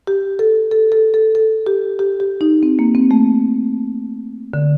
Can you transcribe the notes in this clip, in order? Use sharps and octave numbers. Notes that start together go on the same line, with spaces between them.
G4
A4
A4
A4
A4
A4
G4
G4
G4
D#4
C4
A#3
C4
A3
D3